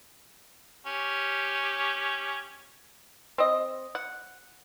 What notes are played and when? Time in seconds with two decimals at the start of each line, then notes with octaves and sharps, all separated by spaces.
0.87 C#4 G4
3.38 C4 D#5
3.95 F#5